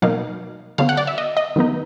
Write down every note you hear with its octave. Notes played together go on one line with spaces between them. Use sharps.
B2 F#3 A#3 D#4 F5
D3 F#3 B3 F5
F#5
D5
E5
D#5
D#5
D#3 F#3 B3 D#4